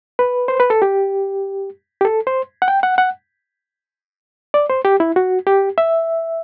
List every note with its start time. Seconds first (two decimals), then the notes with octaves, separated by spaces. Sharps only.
0.19 B4
0.48 C5
0.60 B4
0.70 A4
0.82 G4
2.01 G4
2.05 A4
2.27 C5
2.62 F#5
2.68 G5
2.83 F#5
2.98 F#5
4.54 D5
4.70 C5
4.85 G4
5.00 E4
5.16 F#4
5.47 G4
5.78 E5